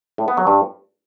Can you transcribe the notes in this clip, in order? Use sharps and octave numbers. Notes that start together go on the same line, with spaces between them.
A2
B3
F#3
G2